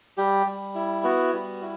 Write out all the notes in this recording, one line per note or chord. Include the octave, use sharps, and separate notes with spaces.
G3 G4
G3
E4
B3 F#4
G3
E4